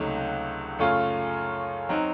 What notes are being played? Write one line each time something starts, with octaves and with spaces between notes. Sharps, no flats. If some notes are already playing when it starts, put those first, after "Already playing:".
Already playing: C#2 C3 F#3 A3 D#4
F#2 C#3 A3 C#4 F4
F#3 C4 D#4